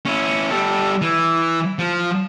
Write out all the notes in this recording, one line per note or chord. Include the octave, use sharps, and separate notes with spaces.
C#4 E4
G3 A4
E3
F3